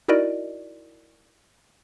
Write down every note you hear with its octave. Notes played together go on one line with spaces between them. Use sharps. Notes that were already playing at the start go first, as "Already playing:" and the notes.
D#4 E4 F#4 A#4 D5 D#5